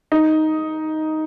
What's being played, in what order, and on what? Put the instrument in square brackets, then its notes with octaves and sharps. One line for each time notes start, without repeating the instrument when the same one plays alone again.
[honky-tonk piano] D#4